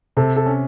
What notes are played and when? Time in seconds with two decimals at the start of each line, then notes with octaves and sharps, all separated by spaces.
0.17 C3 A4
0.36 A4
0.46 C#4